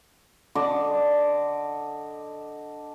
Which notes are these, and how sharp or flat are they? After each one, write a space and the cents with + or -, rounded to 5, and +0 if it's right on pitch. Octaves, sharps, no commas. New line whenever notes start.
D3 +0 D#5 -15 D6 +0